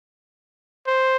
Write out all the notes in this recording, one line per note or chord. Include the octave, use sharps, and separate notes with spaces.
C5